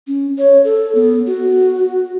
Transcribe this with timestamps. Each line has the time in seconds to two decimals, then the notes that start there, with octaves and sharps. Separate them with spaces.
0.07 C#4
0.38 C#5
0.64 A4
0.95 B3
1.27 F#4